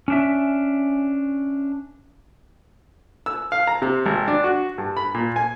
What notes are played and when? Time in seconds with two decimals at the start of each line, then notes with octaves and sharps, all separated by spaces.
0.08 C#4 D4 E5
3.26 E6
3.52 F5
3.67 A#5
3.82 C3
4.06 G#1
4.28 D4
4.44 F#4
4.78 G2
4.97 B5
5.15 A#2
5.36 G#5